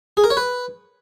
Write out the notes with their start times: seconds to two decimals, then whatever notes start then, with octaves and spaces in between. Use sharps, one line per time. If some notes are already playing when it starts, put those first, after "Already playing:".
0.17 G#4
0.24 A#4
0.30 C#5
0.37 B4